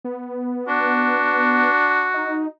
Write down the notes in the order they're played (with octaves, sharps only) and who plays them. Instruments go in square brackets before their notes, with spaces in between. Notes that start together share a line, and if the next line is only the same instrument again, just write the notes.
[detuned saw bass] B3
[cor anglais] D4 [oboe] F#4
[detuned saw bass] D#4